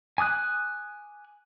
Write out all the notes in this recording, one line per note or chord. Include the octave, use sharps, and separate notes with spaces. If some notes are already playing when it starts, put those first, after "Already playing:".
G#5 D6 D#6 F#6